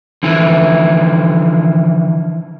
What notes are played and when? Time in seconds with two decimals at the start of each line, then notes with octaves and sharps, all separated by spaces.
0.23 D3 E3 F3 E4